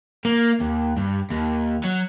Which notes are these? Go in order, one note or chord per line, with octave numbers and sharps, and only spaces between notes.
A#3
D#2
G2
D#2
F#3